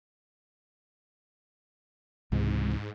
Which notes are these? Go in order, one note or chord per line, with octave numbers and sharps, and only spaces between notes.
C#2 G#2 C3 E3